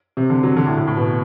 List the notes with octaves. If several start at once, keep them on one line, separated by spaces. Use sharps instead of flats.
C3
D3
F#3
D3
A2
A2
A2
B2